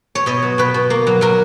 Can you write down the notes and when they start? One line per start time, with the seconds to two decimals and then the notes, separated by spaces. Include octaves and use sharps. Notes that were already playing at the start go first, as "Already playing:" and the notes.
0.15 C#5
0.26 B2 D#5
0.42 F#3
0.58 B2 B4
0.74 B2
0.90 A#3
1.07 F#3
1.21 F#3 A#4